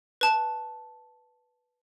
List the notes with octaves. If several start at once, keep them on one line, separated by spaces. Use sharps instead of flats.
B4 A5